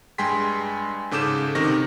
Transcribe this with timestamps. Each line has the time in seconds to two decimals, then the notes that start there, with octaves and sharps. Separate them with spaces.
0.18 G2 G#3 G5 G#5 C6 B6
1.11 G#2 C#3 A4 D6 G6 E7
1.55 C3 D#3 C#6 A#6